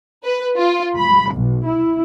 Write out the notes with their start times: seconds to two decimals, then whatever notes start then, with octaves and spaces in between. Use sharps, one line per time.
0.24 B4
0.57 F4
0.97 B5
1.33 B1
1.65 E4